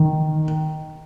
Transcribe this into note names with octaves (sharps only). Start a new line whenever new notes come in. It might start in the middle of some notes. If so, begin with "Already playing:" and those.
Already playing: D#3